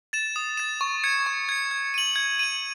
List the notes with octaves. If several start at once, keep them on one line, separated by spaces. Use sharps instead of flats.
A6 E7
D#6
A6 E7
C#6
G#6 C#7
C#6
G#6 C#7
G#6
D#7 F#7
G#6
D#7 F#7